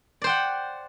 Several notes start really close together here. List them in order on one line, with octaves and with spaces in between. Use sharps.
D5 C5 G5 F#5